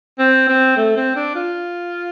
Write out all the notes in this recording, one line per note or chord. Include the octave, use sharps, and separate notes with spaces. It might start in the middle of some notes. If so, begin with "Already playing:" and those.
C4
C4
A3
C4
D4
F4